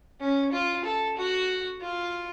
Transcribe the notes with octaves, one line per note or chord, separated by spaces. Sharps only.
C#4
F4
A4
F#4
F4